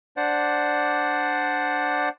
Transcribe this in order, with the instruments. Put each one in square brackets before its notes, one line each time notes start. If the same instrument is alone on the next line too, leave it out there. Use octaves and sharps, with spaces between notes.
[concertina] D4 C5 D5 F#5